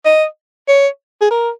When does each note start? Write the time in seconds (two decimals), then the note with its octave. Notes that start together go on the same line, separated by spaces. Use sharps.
0.05 D#5
0.68 C#5
1.21 G#4
1.31 A#4